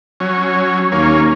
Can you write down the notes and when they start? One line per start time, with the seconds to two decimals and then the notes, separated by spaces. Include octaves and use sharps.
0.20 F#3 C#4
0.92 D#2 A#3 C#4